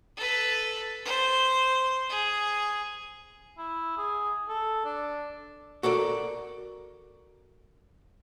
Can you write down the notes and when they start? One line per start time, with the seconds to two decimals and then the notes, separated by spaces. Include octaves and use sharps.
0.17 A4 B4
1.05 C5
2.10 G#4
3.58 E4
3.97 G#4
4.49 A4
4.85 D4
5.83 F#4 A4 A#4 D5